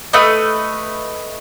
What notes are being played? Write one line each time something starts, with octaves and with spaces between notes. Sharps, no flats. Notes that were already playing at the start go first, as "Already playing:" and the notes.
A3 B4 D#5